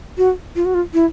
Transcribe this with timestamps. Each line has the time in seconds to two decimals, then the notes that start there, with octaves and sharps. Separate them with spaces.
0.18 F#4
0.56 F4
0.65 F#4
0.74 F4
0.94 E4